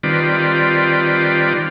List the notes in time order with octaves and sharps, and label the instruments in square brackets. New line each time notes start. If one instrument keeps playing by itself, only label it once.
[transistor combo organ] D#3 G3 C4 F4 B4 D5